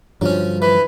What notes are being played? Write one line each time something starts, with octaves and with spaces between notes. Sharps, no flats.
G2 D3 F3 F#3 C#4
E3 B4